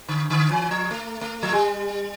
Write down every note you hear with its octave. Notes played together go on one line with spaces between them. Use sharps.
D3
D3
E3
F3
A3
A3
F3
G3